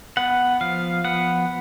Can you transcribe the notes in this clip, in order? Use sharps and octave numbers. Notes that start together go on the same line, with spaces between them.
B3 F#5
F3 F5
B3 F#5